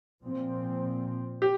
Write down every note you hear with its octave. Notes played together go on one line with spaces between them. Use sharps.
A#2 F3 C4
G4